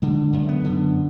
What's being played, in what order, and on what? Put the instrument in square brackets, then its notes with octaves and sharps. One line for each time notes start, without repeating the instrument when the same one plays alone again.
[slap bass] D3 G#3
F#2
B3
D3